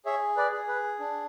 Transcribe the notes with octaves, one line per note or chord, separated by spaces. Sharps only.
G#4 C#5 E5
B4 D5
G#4
B4
D4